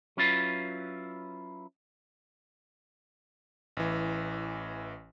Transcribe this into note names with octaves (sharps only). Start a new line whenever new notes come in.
F#3 C#4 E4 F4 B4
A1 E3